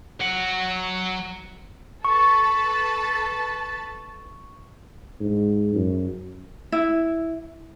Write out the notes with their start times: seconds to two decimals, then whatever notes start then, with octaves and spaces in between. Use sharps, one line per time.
0.20 F#3 F#5
2.05 A4 B4 A5 C#6
5.20 G#2
5.75 F#2
6.72 E4